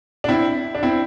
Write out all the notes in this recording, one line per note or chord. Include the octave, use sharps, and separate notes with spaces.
D4
C4 E4
D4
C4 E4